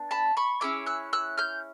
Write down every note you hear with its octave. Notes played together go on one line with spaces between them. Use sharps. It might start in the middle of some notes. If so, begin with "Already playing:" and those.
Already playing: B3 D4
A5 B5
B5 C#6
C#4 E4 G#4 D6 E6
E6 F#6
E6 F#6
F6 G6